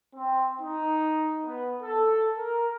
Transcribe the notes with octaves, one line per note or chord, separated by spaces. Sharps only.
C4
D#4
B3
A4
A#4